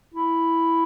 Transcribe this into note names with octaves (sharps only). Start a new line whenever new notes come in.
E4